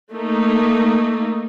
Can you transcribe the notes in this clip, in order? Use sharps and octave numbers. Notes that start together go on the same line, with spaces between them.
A3 A#3 D#4